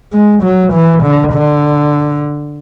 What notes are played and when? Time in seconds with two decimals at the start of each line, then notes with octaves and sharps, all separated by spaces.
0.13 G#3
0.43 F#3
0.73 E3
1.03 D3
1.33 D3